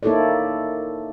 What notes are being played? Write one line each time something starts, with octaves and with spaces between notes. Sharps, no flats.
A#3 D#4 E4 A4 C#5 D5